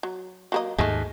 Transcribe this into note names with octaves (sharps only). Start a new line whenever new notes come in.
F#3
F#3 A#3 D#5
D#2 G#2 G#3 A3